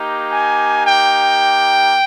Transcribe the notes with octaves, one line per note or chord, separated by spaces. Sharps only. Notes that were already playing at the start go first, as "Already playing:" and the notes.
Already playing: A#3 D#4 G4
G#5
G5